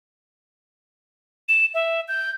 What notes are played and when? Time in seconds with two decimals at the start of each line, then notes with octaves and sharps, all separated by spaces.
1.49 E7
1.74 E5
2.08 G6